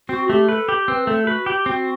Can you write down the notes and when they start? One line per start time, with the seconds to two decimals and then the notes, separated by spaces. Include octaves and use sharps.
0.09 C4 F#4
0.29 A3 G4
0.49 A4 B4
0.69 G4
0.87 C4 B4
1.07 A3 A4
1.27 F#4 B4
1.46 G4
1.66 C4 F#4